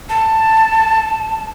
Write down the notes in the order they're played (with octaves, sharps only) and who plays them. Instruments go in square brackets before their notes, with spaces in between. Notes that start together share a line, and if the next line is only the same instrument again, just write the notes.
[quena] A5